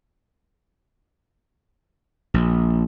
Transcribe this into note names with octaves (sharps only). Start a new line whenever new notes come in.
A#1